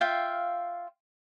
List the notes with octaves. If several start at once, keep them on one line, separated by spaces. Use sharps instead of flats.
F4 E5 F5 G5